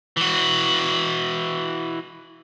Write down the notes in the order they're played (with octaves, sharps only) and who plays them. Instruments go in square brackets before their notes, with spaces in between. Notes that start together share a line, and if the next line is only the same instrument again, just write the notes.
[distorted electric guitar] E3 F#4